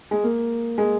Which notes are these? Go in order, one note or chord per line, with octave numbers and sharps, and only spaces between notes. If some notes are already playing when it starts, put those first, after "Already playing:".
G#3
A#3
G#3